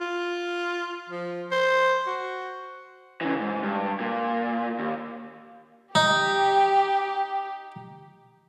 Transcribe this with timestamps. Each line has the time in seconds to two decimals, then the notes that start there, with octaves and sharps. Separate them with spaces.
0.01 F4
1.10 F3
1.51 C5
2.07 F#4
3.21 C#3 E3
3.40 G#2
3.63 G2
4.00 A#2
4.79 D#2
5.95 D#4 G4